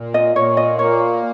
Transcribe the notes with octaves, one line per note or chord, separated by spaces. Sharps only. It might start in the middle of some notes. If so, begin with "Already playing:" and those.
Already playing: A#2
D#5
A#2 C#5
D#5
A#3 C#5